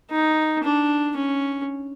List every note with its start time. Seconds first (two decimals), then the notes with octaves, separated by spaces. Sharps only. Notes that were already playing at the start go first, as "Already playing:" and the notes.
0.11 D#4
0.63 D4
1.16 C#4